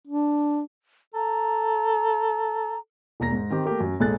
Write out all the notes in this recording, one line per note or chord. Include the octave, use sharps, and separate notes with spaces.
D4
A4 A#5
E1 D#2 A#5 A#6
G#2
D#3 C4 G4
A3 A#3 G4 A#4
F#2
A#1 G#2 G#4 A4 F#6 A6